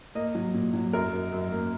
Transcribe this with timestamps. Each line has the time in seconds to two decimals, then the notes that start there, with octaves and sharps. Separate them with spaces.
0.15 A#3 D#5
0.35 F#3
0.54 A#2
0.74 F#3
0.93 F#2 A#4
1.13 F#2
1.32 F#2
1.52 A#3